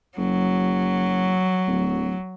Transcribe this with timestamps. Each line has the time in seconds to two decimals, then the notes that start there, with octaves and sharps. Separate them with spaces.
0.18 F#1 F#3
1.67 D1